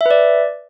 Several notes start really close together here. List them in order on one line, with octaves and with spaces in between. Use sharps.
E5 B4 D5